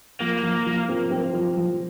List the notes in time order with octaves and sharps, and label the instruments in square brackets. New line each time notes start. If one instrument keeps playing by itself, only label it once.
[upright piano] F3 [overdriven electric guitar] A#3
[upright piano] F3
F3
C4
C4
F3
F3